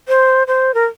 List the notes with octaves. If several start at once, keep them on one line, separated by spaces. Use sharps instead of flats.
C5
C5
A#4